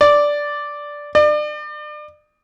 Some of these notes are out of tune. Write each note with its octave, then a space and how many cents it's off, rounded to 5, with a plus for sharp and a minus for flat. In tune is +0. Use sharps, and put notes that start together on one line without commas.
D5 -5
D5 +35